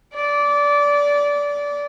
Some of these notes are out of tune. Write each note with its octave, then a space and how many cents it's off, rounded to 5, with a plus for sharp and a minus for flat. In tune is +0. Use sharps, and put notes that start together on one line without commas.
D5 -20